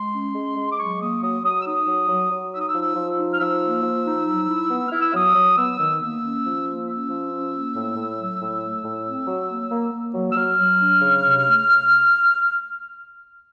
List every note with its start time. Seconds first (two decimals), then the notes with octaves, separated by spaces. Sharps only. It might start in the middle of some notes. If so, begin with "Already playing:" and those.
Already playing: G#3 C6
0.13 C#4
0.35 G#3
0.57 G#3
0.70 D6
0.78 F#3 C#6
1.01 A#3 D#6
1.22 F#3 D#6
1.44 F#3 D#6
1.60 E6
1.65 D#4 D#6
1.88 F#3
2.09 F#3
2.31 F#3
2.52 D#4 E6
2.59 D#6
2.68 E6
2.75 F3
2.82 E6
2.96 F3
3.18 D#4
3.33 F6
3.39 F3 E6
3.61 A#3
3.83 F3
4.05 D#4
4.27 F#3
4.48 E4
4.71 B3
4.87 E4 F6
5.00 E6
5.14 F#3 D#6
5.35 F#3
5.57 B3 E6
5.79 D#3
6.00 A#3 E6
6.23 C#4
6.44 F3
6.65 A#3
6.87 C#4 E6
7.10 F3
7.31 C#4
7.53 A#3
7.75 A2
7.96 A2
8.19 F#3
8.41 A2
8.61 A3
8.84 A2
9.06 C4
9.28 F#3
9.49 A#3
9.71 A#3
9.92 A#3
10.14 F#3
10.31 E6
10.36 F#3 F6
10.58 F#3
10.80 D4
11.01 C#3
11.23 C3
11.44 A3